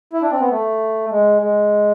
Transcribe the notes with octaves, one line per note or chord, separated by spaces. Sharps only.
E4
D4
C4
B3
A3
G#3
G#3